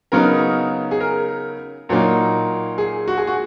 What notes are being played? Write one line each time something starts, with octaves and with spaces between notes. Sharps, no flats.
C#3 F#3 B3 D#4 A#4
G#4
A#4
A#2 F#3 A#3 D#4
G#4
F#4
G#4
F#4